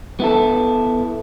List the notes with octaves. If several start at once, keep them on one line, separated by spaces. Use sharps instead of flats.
B3 E4 A4